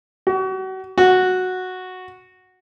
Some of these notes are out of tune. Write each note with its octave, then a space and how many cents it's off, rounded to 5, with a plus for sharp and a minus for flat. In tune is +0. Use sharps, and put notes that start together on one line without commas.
F#4 +35
F#4 -5